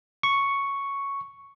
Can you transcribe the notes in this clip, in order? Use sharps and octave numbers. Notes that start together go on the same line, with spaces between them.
C#6